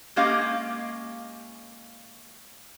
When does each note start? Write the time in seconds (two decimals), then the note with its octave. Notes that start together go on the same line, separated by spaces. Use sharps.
0.16 G#3 A#3 C#4 G4 D#5 F5